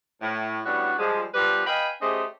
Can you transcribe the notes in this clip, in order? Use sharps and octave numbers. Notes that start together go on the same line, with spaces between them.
A2
A2 G3 B3 C#4 D4 F#4
F3 G3 G#3
F3 G3 B3 G4 A#4 B4
B4 D#5 F5 G5 G#5 B5
A3 C#4 G4 G#4 C5 D#5